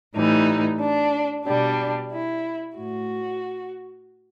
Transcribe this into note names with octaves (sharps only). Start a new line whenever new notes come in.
A2 E3 G3 D#4
D4
B2 G3 D4
E4
A2 F#4